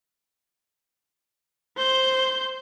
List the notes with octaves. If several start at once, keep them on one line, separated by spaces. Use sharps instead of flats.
C5 G6